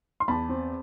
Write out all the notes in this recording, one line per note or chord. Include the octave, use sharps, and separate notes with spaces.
C6
E2 A5 B5
C4